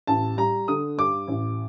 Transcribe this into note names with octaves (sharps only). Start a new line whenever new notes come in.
A1 A5
G3 A#5
D3 D#6
G2 D6
A1